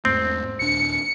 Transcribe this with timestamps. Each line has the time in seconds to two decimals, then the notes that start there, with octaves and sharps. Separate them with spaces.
0.05 E2 G#2 A3 C4
0.59 D#1 D4 C#7